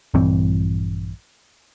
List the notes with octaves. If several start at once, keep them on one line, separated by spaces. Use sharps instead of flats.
A#1 G2 E3 C4